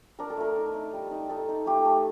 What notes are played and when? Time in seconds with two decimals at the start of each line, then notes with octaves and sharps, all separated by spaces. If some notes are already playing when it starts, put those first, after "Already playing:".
0.19 D4 A#4
0.30 A4
0.37 A3 A#4
0.56 D#4
0.74 D#4
0.93 G3
1.11 D#4
1.29 D#4 A4
1.49 D#4
1.66 A3 G4
1.85 A3